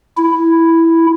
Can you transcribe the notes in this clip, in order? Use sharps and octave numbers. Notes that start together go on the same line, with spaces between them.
E4